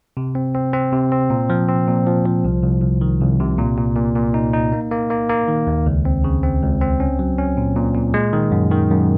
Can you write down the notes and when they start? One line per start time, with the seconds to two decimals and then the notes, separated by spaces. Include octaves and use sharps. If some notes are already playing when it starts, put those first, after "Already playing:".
0.17 C3
0.35 C4
0.55 C4
0.74 C4
0.93 C3
1.12 C4
1.30 A#2
1.50 F3
1.68 C4
1.88 A#2
2.07 F3
2.26 F3
2.44 C2
2.63 C2
2.82 C2
3.01 D#3
3.20 C2
3.40 C3
3.58 A#2
3.78 A#2
3.96 A#2
4.15 A#2
4.34 D#4
4.53 D#4
4.72 A#3
4.91 A#3
5.10 A#3
5.29 A#3
5.48 D#3
5.67 D#2
5.86 C#2
6.05 C4
6.24 C#3
6.43 C4
6.62 C#2
6.81 C4
7.00 C#4
7.19 F#3
7.38 C#4
7.57 A#2
7.76 A#2
7.95 A#2
8.14 G#3
8.33 D#3
8.52 F#2
8.71 D#3
8.90 F#2